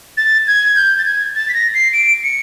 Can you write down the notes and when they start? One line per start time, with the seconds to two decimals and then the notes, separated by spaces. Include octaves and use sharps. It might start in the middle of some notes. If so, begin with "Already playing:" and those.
0.17 A6
0.47 G#6
0.76 G6
0.98 A6
1.05 G#6
1.35 A6
1.49 B6
1.54 A#6
1.74 C7
1.93 D7
2.23 C#7